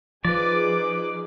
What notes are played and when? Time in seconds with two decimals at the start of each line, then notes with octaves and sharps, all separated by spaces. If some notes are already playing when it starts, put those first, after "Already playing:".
0.25 F3 D#4 F4 G#4 B4 D5 D6